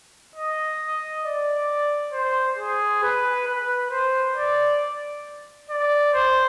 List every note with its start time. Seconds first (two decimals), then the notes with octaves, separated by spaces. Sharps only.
0.36 D#5
1.24 D5
2.13 C5
2.58 G#4
3.03 B4
3.47 B4
3.91 C5
4.36 D5
5.70 D5
6.14 C5